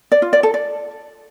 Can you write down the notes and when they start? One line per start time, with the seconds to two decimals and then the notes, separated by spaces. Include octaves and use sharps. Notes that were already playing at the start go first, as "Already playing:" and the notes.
0.12 D5
0.22 F4
0.33 D5
0.43 A4
0.54 D5